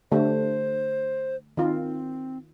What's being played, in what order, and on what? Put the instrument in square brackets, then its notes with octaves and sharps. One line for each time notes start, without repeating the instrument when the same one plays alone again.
[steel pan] D3 A3 G4 [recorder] C5
[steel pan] D#3 F4 [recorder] C4